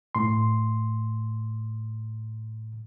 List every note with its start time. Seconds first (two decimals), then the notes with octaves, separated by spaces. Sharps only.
0.15 A2 C6